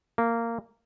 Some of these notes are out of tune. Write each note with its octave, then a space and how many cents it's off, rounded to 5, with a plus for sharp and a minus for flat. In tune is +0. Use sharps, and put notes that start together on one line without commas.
A#3 -15